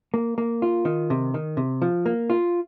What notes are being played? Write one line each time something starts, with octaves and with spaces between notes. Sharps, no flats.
A#3
A#3
F4
D#3
C3
D#3
C3
F3
A#3
F4